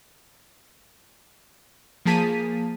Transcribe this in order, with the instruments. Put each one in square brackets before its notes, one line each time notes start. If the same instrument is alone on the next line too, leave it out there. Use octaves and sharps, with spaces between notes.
[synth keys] F3 A#3 G#4 A5 B6 D#7